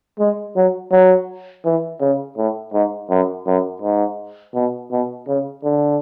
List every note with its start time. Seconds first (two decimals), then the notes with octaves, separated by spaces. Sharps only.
0.19 G#3
0.56 F#3
0.92 F#3
1.65 E3
2.01 C#3
2.37 A2
2.73 G#2
3.10 F#2
3.47 F#2
3.82 G#2
4.55 B2
4.91 B2
5.27 C#3
5.64 D3